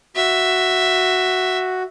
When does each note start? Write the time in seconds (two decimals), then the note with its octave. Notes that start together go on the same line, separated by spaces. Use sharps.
0.16 F#4 E5